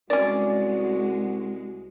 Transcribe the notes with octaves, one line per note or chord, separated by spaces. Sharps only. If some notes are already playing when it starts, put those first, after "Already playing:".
C2 G#3 C#4 F#4 D5